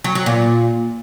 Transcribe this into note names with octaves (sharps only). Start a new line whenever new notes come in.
F#3
F#3
A#2